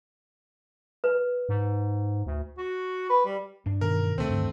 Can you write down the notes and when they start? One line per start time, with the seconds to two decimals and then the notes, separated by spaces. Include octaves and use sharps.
1.04 B4
1.49 G#2
2.26 D2
2.58 F#4
3.10 B4
3.25 G3
3.66 G2 D4
3.81 B2 D#3 E3 A#4
4.18 D2 C#3 A3 C4
4.30 D1 G2 D3 D#3